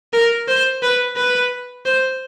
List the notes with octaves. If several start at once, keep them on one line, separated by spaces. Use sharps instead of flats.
A#4
C5
B4
B4
C5